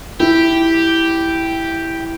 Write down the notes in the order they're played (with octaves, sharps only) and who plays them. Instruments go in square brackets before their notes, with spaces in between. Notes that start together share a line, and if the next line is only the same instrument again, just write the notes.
[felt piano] E4 [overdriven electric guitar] G4